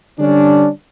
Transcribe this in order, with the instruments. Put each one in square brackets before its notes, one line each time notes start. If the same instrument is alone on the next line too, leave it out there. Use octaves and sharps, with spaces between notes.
[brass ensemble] D3 G3 C#4 D4